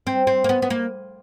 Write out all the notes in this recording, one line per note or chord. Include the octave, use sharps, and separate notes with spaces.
C4
C4
A#3
B3
B3
A#3